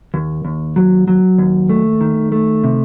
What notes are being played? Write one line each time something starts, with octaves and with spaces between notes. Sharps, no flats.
D#2
D#2
F#3
F#3
D#2
A3
D#3
A3
C3